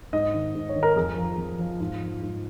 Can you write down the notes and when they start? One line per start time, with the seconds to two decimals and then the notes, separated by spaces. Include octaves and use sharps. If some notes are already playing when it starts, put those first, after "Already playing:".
0.13 G#2 D#5
0.34 D#3
0.55 G#2
0.69 C#5
0.76 D#3
0.83 A#4
0.96 F2 G#4
1.18 F3
1.38 F2
1.59 F3
1.80 G#2 F4
2.01 F3
2.22 G#2